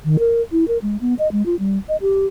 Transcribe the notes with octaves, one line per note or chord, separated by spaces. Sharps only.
D#3
A#4
E4
A#4
G#3
B3
D#5
G#3
F4
G3
D#5
G4